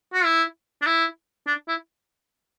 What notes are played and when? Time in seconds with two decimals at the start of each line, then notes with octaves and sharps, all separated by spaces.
0.13 F#4
0.24 E4
0.82 D4
0.86 E4
1.47 D4
1.68 E4